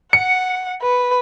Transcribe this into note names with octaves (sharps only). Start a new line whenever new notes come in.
F#5 C#7
B4